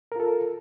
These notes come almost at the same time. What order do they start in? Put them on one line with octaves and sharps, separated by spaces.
A#4 F4 A4